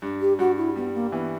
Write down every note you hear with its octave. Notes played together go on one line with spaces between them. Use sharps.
G2
G4
G2 F#4
E4
G3 B3
A#3
E3 B3